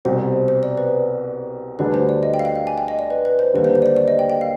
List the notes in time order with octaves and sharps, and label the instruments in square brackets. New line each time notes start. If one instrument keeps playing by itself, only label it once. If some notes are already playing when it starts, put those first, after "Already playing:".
[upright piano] C2 B2 G3 C4 [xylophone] C5
[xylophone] C5
D5
B4
[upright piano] D2 D3 G3 D4 G#4 [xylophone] B4
[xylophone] C5
D5
D#5
G5
F5
G5
F5
G#5
G5
D#5
D5
B4
B4
C5
[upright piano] D#2 D3 G3 [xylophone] B4
[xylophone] C5
C5
D5
C5
D5
D#5
G5
G5
F5